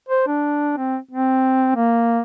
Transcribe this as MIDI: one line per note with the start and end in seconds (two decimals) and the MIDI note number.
0.09 0.25 72
0.27 0.75 62
0.77 0.98 60
1.11 1.73 60
1.76 2.21 58